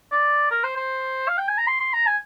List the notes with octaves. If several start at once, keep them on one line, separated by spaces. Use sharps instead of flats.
D5
A#4
C5
C5
F5
G5
G#5
A#5
C6
C6
A#5
G#5